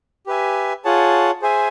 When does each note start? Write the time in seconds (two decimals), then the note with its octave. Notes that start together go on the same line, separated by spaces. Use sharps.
0.26 G4 B4 E5 G#5
0.85 F4 G#4 C#5 F#5 A5
1.42 G#4 C5 E5 G#5